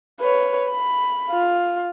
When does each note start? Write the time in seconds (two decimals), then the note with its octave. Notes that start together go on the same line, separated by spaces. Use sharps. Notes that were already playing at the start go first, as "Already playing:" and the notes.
0.21 B4 C#5
0.70 B5
1.31 F4